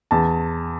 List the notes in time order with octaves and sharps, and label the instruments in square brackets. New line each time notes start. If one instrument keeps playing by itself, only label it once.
[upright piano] E2 A5